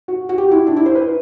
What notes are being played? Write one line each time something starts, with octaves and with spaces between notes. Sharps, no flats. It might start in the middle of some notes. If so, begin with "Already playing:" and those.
F#4
F#4
G4
E4
D4
E4
C5
B4